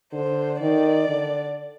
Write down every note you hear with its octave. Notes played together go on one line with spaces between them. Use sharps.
D3 C5
D#3 D5
D3